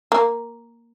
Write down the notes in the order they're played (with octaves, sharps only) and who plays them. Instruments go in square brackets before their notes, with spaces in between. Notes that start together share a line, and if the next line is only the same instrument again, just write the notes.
[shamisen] A#3